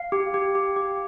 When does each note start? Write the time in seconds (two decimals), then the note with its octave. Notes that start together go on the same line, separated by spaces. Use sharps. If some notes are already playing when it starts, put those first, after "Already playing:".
Already playing: F5
0.12 G4
0.34 G4
0.55 G4
0.76 G4